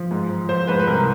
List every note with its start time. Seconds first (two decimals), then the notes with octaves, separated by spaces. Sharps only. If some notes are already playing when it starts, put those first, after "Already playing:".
Already playing: F3
0.11 G#2
0.30 F3
0.49 F3 C5
0.68 G#2 B4
0.80 B4
0.87 C2 A#4